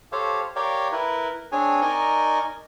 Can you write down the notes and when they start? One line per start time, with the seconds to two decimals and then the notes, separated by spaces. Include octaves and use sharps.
0.12 G4 A4 C5 C#5 F5
0.56 G4 A#4 C#5 D5 F5 G5
0.92 E4 A#4 B4
1.52 C4 D4 G#4 C#5 G#5
1.81 D#4 A#4 D5 D#5 G#5 C#6